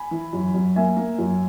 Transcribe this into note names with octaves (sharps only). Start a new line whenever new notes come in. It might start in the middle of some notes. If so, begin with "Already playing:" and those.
Already playing: G#5 B5
E3
F#2
F#2
A#3 E5 G#5
A#3
F#2